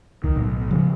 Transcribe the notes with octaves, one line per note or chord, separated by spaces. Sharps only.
C2 D#3
B1 A2
C#3 F3 G#3